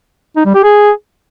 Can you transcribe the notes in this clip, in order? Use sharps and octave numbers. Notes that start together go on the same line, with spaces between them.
D#4
G3
G4
G#4